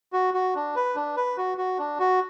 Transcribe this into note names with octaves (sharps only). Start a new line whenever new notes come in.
F#4
F#4
D4
B4
D4
B4
F#4
F#4
D4
F#4